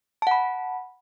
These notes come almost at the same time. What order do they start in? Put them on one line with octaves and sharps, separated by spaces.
A5 F#5 B5